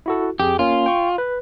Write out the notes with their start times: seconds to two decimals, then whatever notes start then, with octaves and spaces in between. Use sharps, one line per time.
0.06 E4 F#4 A4
0.40 F2 G4 G#4
0.59 A#3 C#4 F4
0.86 G5 C#6
1.18 B4